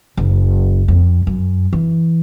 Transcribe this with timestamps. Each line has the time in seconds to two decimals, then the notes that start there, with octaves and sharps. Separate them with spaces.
0.17 F#1
0.88 F2
1.27 F#2
1.73 E3